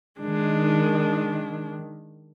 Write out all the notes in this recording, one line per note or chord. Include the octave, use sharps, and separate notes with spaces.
D#3 G#3 D4